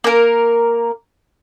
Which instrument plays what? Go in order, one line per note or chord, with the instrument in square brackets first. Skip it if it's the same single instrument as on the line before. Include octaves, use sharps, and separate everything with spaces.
[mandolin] A#3 A#4